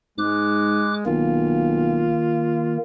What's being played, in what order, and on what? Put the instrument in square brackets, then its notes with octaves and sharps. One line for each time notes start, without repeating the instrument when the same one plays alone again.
[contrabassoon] G#2 [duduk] G#3 [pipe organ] D6 F#6
[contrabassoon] B1 [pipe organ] D#3 A#3 [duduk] F4